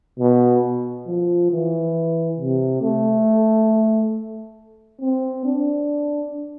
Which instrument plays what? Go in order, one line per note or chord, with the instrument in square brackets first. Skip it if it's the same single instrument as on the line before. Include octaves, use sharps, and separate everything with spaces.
[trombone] B2
F3
E3
C3
A3
C4
D4